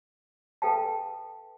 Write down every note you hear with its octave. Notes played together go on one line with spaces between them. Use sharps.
A4 B4 F5 G5 A5